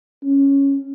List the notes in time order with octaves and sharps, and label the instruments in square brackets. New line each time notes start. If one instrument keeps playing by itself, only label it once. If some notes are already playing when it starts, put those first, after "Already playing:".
[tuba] C#4